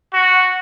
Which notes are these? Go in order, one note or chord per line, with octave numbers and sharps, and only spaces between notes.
F#4